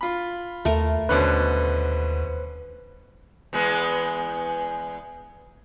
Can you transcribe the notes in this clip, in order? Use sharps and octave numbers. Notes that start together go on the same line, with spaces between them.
F4 B5
D#2 A3 A#4
D#2 B2 D3 C#4 B4 C5
E2 G#3 B3